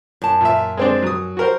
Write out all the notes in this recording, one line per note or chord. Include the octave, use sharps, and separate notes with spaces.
F#2 A5
A#2 E5
G#3 C4 D4
F#3 D#6
F#4 A#4 C5